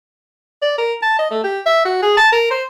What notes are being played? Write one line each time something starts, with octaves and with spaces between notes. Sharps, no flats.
D5
A#4
A5
D#5
A3
G4
E5
F#4
G#4
A5
A#4
C5